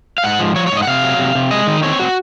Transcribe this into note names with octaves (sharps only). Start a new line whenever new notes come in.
F5
G#2 F#5
F3
F3 C#5
C#5
G#2
D#5
F#5
C3 F5
F#3
C3
C3
G#3 D#5
D#3
C4 C#5
F#4